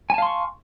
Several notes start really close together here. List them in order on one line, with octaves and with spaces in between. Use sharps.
G#5 A5 F5 C6 C#6